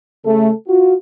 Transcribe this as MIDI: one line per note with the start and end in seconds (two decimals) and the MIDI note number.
0.25 0.51 49
0.25 0.51 57
0.25 0.51 69
0.68 0.93 65
0.68 0.93 66